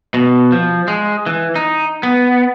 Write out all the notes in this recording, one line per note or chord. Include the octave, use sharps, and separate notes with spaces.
B2
F3
G#3
E3
D#4
B3